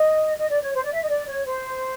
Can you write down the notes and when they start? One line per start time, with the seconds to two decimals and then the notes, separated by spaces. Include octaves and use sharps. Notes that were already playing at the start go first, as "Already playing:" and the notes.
Already playing: D#5
0.37 D#5
0.49 D5
0.61 C#5
0.73 C5
0.82 D5
0.91 E5
1.00 D#5
1.08 D5
1.26 C#5
1.45 C5